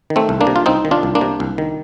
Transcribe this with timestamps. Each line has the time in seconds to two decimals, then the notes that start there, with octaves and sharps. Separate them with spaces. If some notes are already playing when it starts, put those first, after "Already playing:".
0.10 D#3
0.16 A3 C4
0.29 C2
0.41 A#3 D4
0.47 C3
0.56 F4
0.66 C2 C4 D#4
0.85 D#3
0.91 D4 F4
1.03 C2
1.15 A#3 D4
1.21 C3
1.40 C2
1.58 D#3